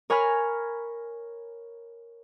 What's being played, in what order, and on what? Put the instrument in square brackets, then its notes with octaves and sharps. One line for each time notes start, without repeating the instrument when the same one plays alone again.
[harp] A#4 C#5 G#5 B5 F6